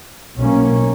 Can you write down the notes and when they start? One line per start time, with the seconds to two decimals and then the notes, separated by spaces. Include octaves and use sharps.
0.35 B1 B2 A#3 C#4